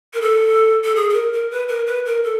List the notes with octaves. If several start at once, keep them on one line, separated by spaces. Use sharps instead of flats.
A#4
A4
A4
G#4
A4
A#4
A#4
B4
A#4
B4
A#4
A4